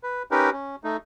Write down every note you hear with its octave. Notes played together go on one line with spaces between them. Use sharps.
B4
C#4 D#4 G4 A#4 B4
C#4
A3 D#4